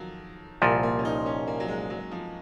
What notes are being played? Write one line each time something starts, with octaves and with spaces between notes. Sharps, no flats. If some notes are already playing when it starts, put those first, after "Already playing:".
Already playing: D#3 F3 F#3
C2 A#2 F3 A#3
A#3
C#4
D#4
C#4
A#3
F#3
G#3
F#3
F3